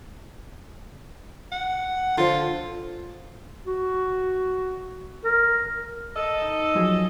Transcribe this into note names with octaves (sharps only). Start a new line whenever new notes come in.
F#5
D3 F3 F4
F#4
A#4
A4 D#5
D#4
F3 F#3 G#4